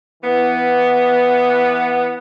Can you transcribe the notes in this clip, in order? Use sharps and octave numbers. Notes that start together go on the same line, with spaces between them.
E3 B3